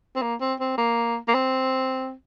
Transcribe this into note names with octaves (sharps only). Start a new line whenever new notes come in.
C4
A#3
C4
C4
A#3
A#3
C4